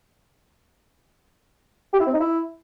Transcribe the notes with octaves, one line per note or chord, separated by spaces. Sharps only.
G4
E4
C4
D#4
E4